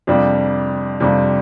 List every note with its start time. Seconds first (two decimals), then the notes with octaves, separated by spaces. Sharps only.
0.07 F2 C3 G3 D4 F4
1.00 F2 C3 G3 D4 F4